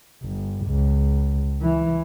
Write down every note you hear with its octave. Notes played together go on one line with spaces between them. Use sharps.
G1
C#2
E3